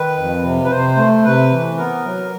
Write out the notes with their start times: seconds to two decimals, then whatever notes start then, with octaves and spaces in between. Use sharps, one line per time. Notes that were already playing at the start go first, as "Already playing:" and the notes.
Already playing: D#3 B4
0.17 F2
0.43 C3
0.64 B4
0.70 C3 C5
0.97 A3
1.24 C3 B4
1.52 E3
1.77 B3 A#4
2.05 F#3